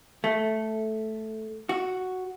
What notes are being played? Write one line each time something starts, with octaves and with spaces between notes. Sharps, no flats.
A3
F#4